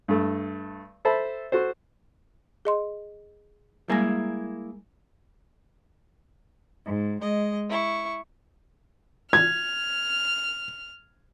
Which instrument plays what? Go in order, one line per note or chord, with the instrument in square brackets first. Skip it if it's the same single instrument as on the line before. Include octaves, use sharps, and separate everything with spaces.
[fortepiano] G2 A3
A4 C5 E5 A5 B5
F#4 A4 C5
[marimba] G#4 D#5 C6
[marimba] G3 G#3 A#6 [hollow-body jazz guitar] A#3 E4 G#4
[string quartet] G#2
G#3 D#5
E4 C#6
[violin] F6 [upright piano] G#6